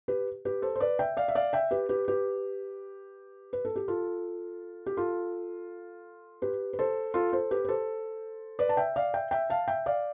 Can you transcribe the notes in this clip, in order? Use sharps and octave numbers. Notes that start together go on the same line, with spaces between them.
G4 B4
G4 B4
A4 C5
C5
B4 D5
E5 G5
D5 F5
E5
D5 F5
E5 G5
G4 B4
G4 B4
G4 B4
B4
A4
G4
F4 A4
G4
F4 A4
G4 B4
B4
A4 C5
F4 A4
A4 C5
G4 B4
B4
A4 C5
B4 D5
A5
E5 G5
D5 F5
E5 G5
E5 G5
F5 A5
E5 G5
D5 F5